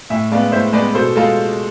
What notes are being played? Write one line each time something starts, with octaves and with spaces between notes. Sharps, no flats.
A2 E5 G#5
G#3 B3 D5 F5
A2 C5 E5
G#3 B3 B4 D5
B2 A4 C5
G#3 F4 A4